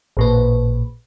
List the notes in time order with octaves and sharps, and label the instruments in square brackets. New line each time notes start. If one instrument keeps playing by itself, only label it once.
[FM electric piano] A1 A#2 B4